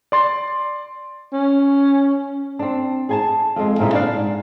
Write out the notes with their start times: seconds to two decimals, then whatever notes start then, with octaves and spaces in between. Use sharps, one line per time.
0.12 D5 C6 A6
1.33 C#4
2.59 C4 D4
3.09 G#4 G#5 A5
3.56 F2 G#3
3.79 A#2 C#3 G3 D#4 E4
3.93 D4 B4 D5 F5
4.14 G#2